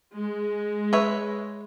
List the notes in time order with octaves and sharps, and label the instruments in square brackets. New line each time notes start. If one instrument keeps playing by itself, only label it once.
[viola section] G#3
[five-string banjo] B4 C#5 E5